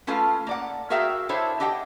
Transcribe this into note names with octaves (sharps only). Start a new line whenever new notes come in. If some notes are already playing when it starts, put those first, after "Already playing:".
A3 C#4 F4 A4 B4 F5
A#3 D5 F#5
F#4 G#4 A#4 E5 F5 G5
D4 E4 A4 C5 C#5 E5
D4 G4 D#5 F#5 G5